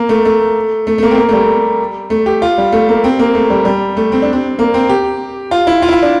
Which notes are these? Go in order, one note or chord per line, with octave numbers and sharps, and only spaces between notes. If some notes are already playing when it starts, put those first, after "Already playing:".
Already playing: A#3
A3
A3
A3
A3
A#3
C4
A#3
A3
G3
A3
G4
F4
G3
A3
A#3
C4
A#3
A3
G3
G3
A3
C4
D4
C4
A#3
C4
G4
F4
E4
F4
E4
F4
D4